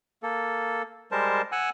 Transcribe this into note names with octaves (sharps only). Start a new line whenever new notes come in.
A#3 A4
G3 G#3 A#4 C5 A5
F#5 G#5 E6 F#6